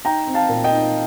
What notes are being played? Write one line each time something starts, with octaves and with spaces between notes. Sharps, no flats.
D#4 G5 A#5
C4
F5 A5
A#2
D#5 G5
D#4